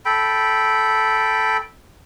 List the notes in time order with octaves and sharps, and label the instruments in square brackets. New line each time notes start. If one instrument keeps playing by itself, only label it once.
[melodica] A4 G5 B5